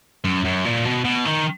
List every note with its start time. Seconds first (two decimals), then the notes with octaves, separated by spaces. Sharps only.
0.24 F#2
0.44 F#2
0.65 A#2
0.85 B2
1.04 B2
1.25 D#3